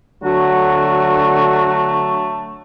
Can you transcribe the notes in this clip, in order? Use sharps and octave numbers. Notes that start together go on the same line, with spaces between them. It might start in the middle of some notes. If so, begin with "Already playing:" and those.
D3 F#3 A3 F#4